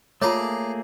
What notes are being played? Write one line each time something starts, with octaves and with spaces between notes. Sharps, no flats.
A3 A#3 F4 G#4 C#5 D5 A5 A#5